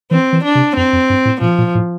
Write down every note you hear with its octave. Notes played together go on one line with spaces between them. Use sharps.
E3 C4
E3
D4
C3
F2 C4
F2
G2
A2
A#2 F3
A#2
A2